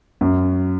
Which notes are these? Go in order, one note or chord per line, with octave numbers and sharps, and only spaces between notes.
F#2